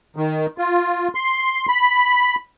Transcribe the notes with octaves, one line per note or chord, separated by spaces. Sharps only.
D#3
F4
C6
B5